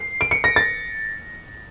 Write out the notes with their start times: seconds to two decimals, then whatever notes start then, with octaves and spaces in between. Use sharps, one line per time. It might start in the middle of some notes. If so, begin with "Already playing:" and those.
Already playing: C7
0.21 D7
0.31 C#7
0.44 A#6
0.56 A6